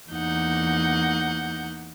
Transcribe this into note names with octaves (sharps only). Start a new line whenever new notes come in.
E2 A#3 D#4 F#5 G6